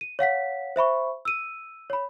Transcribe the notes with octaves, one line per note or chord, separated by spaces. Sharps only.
D#7
C#5 F5 F#5 B6
C5 E5 B5 C#6
E6 D#7
C#5 B5